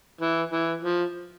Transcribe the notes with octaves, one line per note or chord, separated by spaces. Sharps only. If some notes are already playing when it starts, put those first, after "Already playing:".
E3
E3
F3